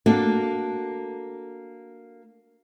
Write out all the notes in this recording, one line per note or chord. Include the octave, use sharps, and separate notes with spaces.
A#3 D4 F#4 A4